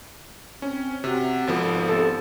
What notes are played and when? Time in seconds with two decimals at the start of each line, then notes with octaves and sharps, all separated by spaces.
0.62 C4 C#4
1.04 C3 F#4
1.47 G#1 F3 B3 A4
1.88 C3 A4